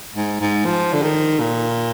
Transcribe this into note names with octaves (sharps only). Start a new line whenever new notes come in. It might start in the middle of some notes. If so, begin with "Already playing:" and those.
G#2
G#2
F3
D3
D#3
A#2